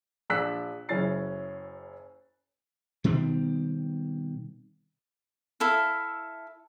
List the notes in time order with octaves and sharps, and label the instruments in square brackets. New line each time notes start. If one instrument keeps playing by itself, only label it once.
[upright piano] A#1 D4 E6 F#6 B6
F#1 F#2 C#4 E4 A6 C7
[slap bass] B2 D#3 G3 C4
[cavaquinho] E4 A4 F5